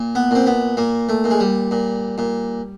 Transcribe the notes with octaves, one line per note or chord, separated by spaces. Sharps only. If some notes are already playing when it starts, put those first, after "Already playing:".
Already playing: A#2
B3
A#2 C4
B3
A#2 A#3
A3
A#2
G#3
G3
A#2
A#2